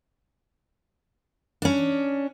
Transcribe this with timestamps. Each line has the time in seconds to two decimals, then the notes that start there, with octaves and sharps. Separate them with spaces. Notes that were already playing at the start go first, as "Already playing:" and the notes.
1.62 C#4 D4